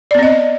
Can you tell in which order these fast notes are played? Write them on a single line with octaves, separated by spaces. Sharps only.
D5 B3 C4 D#5